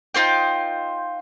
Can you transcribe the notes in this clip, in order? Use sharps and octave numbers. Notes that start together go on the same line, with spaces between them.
D#4 F4 C5 G5